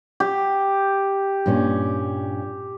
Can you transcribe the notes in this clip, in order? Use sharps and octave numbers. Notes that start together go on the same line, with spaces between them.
G4
G2 A#2 C#4